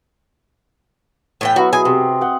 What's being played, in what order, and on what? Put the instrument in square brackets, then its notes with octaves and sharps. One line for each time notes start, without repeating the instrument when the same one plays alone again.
[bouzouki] A2 E3 G5
[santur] F#3 B3 E4 [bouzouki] F#4
[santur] G#4 D#5 E5 [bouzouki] G#5
[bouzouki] C3 [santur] C4
[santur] F#5 G5